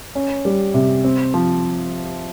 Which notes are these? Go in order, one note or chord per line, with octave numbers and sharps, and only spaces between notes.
C#4
G3
C3
C4
F3